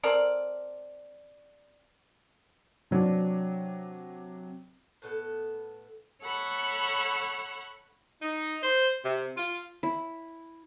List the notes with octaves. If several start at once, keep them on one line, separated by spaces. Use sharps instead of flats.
C4 A4 A#4 D5
C3 F#3 C4 D4
A2 B3 A4
A4 C#5 F#5 B5 C#6
D#4
C5
C3
F4
E4